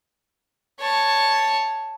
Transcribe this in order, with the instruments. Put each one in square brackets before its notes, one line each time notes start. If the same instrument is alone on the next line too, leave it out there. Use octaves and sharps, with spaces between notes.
[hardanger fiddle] C#5 A5